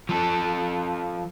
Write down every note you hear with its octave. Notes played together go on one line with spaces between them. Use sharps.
F3 A4